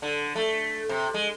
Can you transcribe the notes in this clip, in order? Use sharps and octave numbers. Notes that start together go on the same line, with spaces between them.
D3
A3
C3
G#3